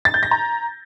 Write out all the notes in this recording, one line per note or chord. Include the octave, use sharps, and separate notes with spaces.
A6
G6
A#6
A#5